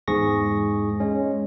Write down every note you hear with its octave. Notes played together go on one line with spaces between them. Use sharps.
E2 G#2 G#4 C#6 A#6
G#3 C#4